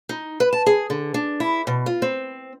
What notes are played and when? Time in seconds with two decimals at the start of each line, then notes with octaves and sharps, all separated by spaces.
0.09 D#4
0.40 B4
0.53 A5
0.66 G#4
0.90 D3
1.14 D4
1.40 E4
1.67 B2
1.86 F4
2.02 C4